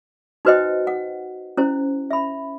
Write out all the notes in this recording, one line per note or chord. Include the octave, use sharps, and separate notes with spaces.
D#4 F#4 B4 C5 D#5 G5
F#5
C#4 E4 C5
E5 B5